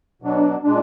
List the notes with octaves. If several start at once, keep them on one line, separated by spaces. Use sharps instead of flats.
B2 F#3 D4
A#2 G#3 D4